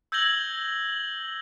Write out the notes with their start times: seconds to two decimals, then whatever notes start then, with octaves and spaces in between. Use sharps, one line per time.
0.12 E6 G6 G#6 A#6 F#7 G7